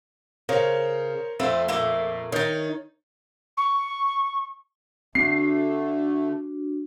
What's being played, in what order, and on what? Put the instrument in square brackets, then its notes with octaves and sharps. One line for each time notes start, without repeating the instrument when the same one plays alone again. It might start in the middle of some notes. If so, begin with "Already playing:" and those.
[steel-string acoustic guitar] C#3 [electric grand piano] A#4 C5 C#5
[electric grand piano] F2 [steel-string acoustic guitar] A3 C4 F4
[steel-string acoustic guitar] A#2 A3 A#3
[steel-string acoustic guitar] D#3 D#4 [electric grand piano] C#5 G6 A6
[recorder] C#6
[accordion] D3 A3 [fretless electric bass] C4 [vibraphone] D4 F#4 [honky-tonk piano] C7